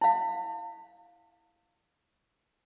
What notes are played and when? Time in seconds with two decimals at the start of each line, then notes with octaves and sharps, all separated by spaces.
0.01 E4 F5